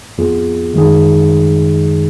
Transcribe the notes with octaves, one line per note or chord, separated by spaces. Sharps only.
F2 F3 B3 F4 G#4
F#2 D#3 G#3 D#4 G#4